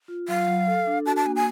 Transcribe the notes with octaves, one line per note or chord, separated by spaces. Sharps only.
F4
F#3 F5
F#3
A4
D4
F#4 A5
A5
A#3 G#5
G#5